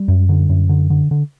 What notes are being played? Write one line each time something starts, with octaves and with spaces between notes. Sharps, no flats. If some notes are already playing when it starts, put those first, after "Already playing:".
Already playing: G3
F#2
D3
F#2
D3
D3
D3